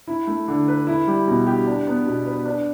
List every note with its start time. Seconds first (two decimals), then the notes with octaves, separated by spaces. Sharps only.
0.08 E4
0.27 A3
0.48 D3
0.68 B4
0.87 E4
1.07 G3
1.28 B2
1.47 G4
1.67 D4
1.87 B3
2.06 B2
2.26 B4
2.45 D4